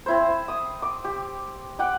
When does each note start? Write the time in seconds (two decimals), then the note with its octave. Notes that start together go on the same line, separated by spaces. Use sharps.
0.06 C4 E4 C5
0.48 D#6
0.82 D6
1.04 G4
1.79 F#5 G5 D6